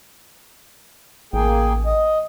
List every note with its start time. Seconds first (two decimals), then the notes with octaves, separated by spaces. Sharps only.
1.33 A1 A#3 G#4 G5
1.86 D#5